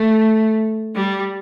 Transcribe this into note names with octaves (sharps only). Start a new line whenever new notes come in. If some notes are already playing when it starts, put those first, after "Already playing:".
Already playing: A3
G3